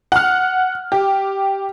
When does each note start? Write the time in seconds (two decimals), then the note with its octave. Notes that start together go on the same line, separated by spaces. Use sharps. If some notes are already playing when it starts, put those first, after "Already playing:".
0.12 F#5 F6
0.92 G4